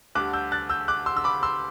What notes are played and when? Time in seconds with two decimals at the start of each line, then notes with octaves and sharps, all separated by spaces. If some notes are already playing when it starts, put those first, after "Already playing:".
0.15 D2 D3 G3 D6 F#6
0.33 E6 G6
0.52 F#6 A6
0.70 E6 G6
0.88 D6 F#6
1.06 C6 E6
1.17 E6
1.24 B5 D6
1.43 C6 E6